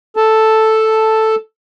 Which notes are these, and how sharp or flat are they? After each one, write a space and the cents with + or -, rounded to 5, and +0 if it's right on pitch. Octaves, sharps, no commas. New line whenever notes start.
A4 +0 A5 +0